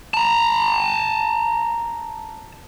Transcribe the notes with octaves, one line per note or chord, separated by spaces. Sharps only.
A5 A#5